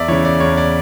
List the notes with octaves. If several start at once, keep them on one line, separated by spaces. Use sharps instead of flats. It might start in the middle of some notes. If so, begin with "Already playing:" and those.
Already playing: E2 D5 E5
C#3 E3 C#5
D5
E2 C#5
D5